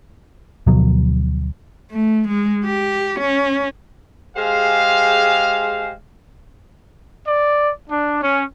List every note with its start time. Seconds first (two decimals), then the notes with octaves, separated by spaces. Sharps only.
0.67 D2 B2 F3 F#3
1.91 A3
2.28 G#3
2.65 G4
3.20 C#4
4.37 G#3 G4 G#4 C5 F5
7.27 D5
7.90 D4
8.21 C#4